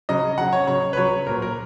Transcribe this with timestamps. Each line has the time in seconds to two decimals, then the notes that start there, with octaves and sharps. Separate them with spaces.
0.09 C#3 F#3 D#5
0.38 C#3 F#3 F#5
0.53 C#5
0.67 C#3 F#3 C#5
0.93 B4
0.97 C#3 F#3 C#5
1.27 A#2 F#3 A#4
1.42 A#4